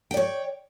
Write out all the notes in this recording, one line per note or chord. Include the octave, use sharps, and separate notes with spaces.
C#5 D5 G5